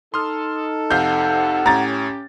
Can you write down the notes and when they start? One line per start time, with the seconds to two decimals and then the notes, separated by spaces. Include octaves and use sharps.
0.14 D#4 A4 C6 D#6 F6
0.90 F2 C3 F5 F#5 G6
1.66 A2 C#4 G4 A#5 A6